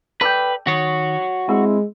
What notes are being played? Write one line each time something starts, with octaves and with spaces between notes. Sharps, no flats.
A4 B4 D5 G5
D#3 F#4 C#5
G#3 C4 E4